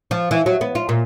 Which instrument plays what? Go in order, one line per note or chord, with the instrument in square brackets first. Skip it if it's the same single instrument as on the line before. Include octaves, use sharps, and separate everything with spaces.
[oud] F3
E3
F#3
B3
F4
A#2